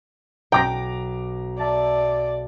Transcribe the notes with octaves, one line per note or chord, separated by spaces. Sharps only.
B1 G5 A#5 D6 A#6
D5 E5 A5